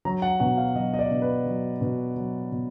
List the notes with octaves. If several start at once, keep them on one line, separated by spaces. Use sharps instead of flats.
F#3 A#5
F#5
B2 F#5
F5
F#3 D#5
D#5
D5
B2
B4
F#3
B2
F#3
B2